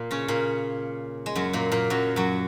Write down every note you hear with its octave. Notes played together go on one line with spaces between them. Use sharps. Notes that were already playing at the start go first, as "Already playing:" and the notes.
Already playing: A#2 A#3
C#3 C#4
A#2 A#3
G#3
F#2 F#3
A#2 A#3
A#2 A#3
F#2 F#3
F#2 F#3